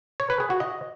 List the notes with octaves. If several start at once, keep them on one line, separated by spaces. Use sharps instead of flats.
C#5
B4
G#4
F#4
D#5